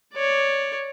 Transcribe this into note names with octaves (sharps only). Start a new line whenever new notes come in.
C#5 D5